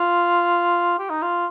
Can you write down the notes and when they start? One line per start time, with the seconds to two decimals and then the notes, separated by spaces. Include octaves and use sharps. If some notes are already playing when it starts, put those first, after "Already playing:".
Already playing: F4
0.99 G4
1.10 D#4
1.22 F4